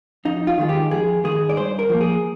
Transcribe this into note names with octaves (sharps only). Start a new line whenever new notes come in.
F2 D#4
F4
D#3 G#3
G4
F2 G#4
D#3 G#3 G#4
D5
G2 C5
A#4
F3 A#3
G#4